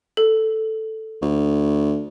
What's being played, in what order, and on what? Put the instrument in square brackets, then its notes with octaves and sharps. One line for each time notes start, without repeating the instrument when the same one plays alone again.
[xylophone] A4
[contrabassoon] D2